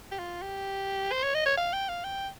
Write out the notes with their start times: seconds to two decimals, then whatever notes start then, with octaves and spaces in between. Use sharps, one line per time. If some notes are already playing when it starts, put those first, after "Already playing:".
0.11 G4
0.19 F4
0.42 G4
1.12 C5
1.23 C#5
1.35 D#5
1.46 C#5
1.57 F5
1.73 G5
1.89 F5
2.04 G5